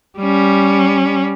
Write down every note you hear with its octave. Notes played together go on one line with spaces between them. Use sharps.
G3 C#4